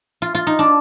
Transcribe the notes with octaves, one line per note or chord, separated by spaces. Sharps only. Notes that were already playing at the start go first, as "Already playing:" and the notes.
F4
F4
D#4
D4